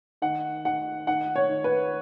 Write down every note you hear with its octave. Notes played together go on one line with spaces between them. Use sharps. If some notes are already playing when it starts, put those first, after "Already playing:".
D#3 F#5
D#3 F#5
D#3 F#5
C#5
D#3
B4